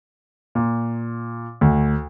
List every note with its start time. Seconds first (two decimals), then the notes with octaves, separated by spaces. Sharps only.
0.55 A#2
1.61 D2